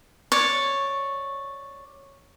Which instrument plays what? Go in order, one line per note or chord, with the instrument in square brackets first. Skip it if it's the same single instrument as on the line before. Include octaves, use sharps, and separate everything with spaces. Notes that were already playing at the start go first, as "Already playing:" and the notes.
[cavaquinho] C#5 D5